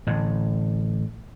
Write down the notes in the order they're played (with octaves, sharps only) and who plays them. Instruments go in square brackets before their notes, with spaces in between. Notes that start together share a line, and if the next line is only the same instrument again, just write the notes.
[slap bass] A1 A2 D3